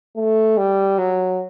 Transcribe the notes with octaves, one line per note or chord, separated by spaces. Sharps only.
A3
G3
F#3